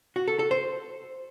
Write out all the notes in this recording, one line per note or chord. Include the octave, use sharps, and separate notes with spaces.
F#4
A4
A4
C5